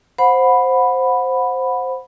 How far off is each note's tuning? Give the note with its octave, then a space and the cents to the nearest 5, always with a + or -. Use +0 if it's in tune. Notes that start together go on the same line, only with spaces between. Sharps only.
C5 +0 F#5 -25 B5 +0